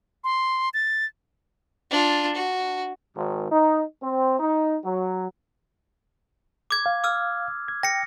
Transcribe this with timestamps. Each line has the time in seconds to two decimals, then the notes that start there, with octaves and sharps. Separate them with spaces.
0.24 C6
0.74 A6
1.91 D4 F4
2.36 F#4
3.16 G#1
3.51 D#4
4.02 C4
4.39 D#4
4.84 F#3
6.71 D6 G#6
6.86 F5
7.04 D6 E6 F6
7.68 G#6
7.83 G5 A#6 C#7